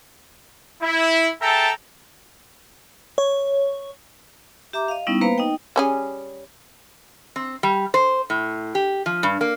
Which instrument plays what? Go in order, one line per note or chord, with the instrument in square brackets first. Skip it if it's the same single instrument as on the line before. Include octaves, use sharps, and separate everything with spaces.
[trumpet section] E4
G#4 A4 E5 G5 A5 A#5
[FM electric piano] C#5
[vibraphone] G4 E5 A#5 D6
D#5 F5
G3 B3 C#4 D#4 E4
A#3 B3 B4 C5 F5 A#5
D#4 D#5 G5
[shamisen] G3 C#4 G#4
[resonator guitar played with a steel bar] C4
G3
C5
A2
G4
F3
G2
A#3